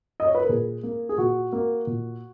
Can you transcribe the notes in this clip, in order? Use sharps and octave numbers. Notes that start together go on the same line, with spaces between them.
D#5
C#5
B4
A#4
A#2 G#4
A#3
G#4
A#2 F#4
A#3
A#2